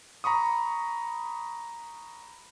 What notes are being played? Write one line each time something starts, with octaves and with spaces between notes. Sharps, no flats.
A#5 B5 C#6 D#6